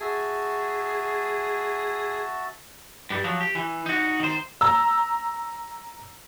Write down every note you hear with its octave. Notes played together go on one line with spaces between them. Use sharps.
F#4 G#4 E5 A5
G2 G3
F3 F#3
G4
E3
D#4 F#4
D#3 C5
A#5 E6